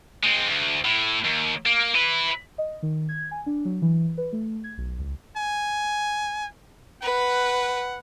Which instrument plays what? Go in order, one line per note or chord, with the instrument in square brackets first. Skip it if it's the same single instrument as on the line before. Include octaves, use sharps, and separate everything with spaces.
[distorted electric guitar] G#3 C4
D2
A2
D#2
A#3
E4 B4
[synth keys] D#5
D#3
G#6
G#5
D4
F#3
E3
B4
A3
G#6
B1
C#2
[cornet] G#5
[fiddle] B4 [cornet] F#5